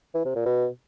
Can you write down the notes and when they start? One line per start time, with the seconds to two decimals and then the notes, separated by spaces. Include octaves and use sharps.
0.15 E3
0.25 C3
0.35 A#2
0.46 B2